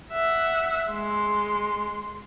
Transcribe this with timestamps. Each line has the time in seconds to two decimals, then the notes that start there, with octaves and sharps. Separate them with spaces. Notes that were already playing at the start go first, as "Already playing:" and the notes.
0.13 E5 F#5
0.91 G#3 C6